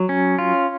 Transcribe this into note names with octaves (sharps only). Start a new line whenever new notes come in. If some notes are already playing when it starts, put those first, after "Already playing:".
Already playing: F#3
C#4
F4